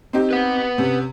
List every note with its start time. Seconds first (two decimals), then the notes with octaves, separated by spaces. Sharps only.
0.13 C4 D#4 G4
0.31 B4 F#5
0.78 C3 C#4